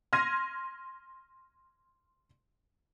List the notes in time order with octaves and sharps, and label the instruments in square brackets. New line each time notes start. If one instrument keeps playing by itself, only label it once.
[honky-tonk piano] C6 F6 G#6 A#6 D#7